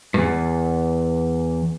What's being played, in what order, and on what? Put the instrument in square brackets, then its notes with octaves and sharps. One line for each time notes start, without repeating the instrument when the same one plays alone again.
[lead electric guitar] E2 G2